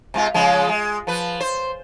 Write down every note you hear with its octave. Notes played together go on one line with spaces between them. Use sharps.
C3 G#3 F4
C#3 F3 G#3
G#3
F3 B4
C5